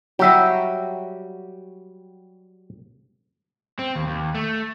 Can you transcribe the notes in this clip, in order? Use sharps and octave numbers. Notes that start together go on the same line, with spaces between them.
F#3 G3 F#4 G4 E5
C4
D#2
D#2
A3